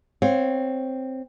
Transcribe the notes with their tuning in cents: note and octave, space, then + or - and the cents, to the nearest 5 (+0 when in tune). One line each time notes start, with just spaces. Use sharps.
C4 +0 C#5 +0 F5 +35